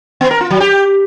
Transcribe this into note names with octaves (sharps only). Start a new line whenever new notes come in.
B3
A#4
F4
F#3
G4